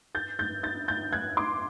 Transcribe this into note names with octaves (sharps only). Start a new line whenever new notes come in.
G6 A6
G6 A6
G6 A6
G6 A6
F#6 G#6
C6 D6